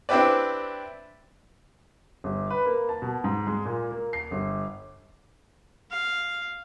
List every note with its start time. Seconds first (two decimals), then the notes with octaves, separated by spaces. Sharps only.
0.09 C4 D4 E4 G4 B4 D5
2.24 G1
2.50 B4
2.66 A#3
2.89 A5
3.02 B2
3.24 G#2
3.47 G#3
3.65 A#2
3.91 A#3
4.13 C7
4.31 G1
5.90 F5